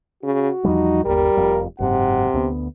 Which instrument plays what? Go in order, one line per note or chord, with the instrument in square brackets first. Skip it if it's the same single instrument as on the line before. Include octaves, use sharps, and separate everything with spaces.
[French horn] C#3 [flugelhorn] F#4
[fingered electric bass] E2 F3 G3 [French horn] D#4
[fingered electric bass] G1 D#2 [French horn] G3 [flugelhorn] A#4
[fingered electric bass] F1 F2
[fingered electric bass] F#1 G#2 [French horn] C3 [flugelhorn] F#5
[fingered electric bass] D2 B2 B3